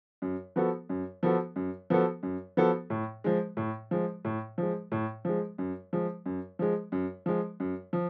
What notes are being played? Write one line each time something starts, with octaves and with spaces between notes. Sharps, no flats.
F#2
F3 B3 F#4 A4
F#2
F3 B3 F#4 A4
F#2
F3 B3 F#4 A4
F#2
F3 B3 F#4 A4
A2
F3 G#3
A2
F3 G#3
A2
F3 G#3
A2
F3 G#3
F#2
F3 G#3
F#2
F3 G#3
F#2
F3 G#3
F#2
F3